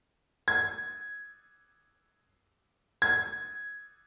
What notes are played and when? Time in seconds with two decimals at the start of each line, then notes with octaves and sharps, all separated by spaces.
0.48 G#6
3.02 G#6